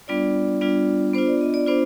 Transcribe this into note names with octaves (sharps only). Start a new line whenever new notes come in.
G3 B3 D4 F4 D5
G3 B3 D4 F4
B3 D4 F4 C5
D5
D#5
D5
B3 D4 F4 C5